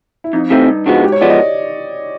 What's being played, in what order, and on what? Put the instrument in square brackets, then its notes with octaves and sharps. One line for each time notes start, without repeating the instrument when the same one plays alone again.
[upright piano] E4
[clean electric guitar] F2 [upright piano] D#4
[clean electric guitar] C3 E3 A3 C4 [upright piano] D#4
[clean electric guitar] G2
[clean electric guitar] D3 F3 G#3 B3 [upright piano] F#4
[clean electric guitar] G#2 [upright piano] G4
[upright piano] C#5
[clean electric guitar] F3 G#3 B3 [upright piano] D5
[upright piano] D#5